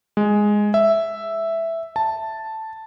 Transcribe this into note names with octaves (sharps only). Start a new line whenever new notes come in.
G#3
E5
A5